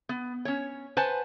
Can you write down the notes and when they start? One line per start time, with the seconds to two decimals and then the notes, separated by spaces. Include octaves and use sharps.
0.09 B3
0.45 C#4 C#5
0.97 B4 C5 F#5 G#5 A5